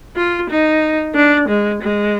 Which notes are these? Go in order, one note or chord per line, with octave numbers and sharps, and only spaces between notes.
F4
D#4
D4
G#3
G#3